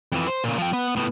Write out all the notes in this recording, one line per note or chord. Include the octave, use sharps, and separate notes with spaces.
F2 E3
C5
A#2 C#3
F3 G5
B3
A2 B3